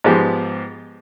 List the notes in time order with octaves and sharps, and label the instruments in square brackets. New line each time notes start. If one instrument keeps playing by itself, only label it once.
[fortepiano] G#2 F3 G#3 B3 G4